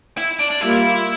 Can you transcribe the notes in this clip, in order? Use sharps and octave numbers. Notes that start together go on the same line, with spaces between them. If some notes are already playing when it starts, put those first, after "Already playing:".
E4
D4
D4
G3 A#3 E4 F4